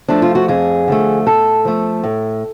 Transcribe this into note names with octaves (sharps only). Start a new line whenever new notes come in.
F3 A3 D4
F4
F#4
F2 G#4
D3 F3 A3
A2 A4
F3 A3
A2